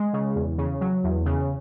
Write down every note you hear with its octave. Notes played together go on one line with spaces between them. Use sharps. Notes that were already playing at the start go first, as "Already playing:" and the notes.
Already playing: G#3
C#3
E2
C#3
F#3
E2
C#3